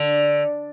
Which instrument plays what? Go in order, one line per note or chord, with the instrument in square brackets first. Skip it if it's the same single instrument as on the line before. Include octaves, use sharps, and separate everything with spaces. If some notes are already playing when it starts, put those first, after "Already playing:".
Already playing: [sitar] D3